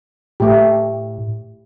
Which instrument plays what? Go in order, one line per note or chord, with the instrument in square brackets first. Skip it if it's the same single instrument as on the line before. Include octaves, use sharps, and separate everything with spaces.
[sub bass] A2 [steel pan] A3 G4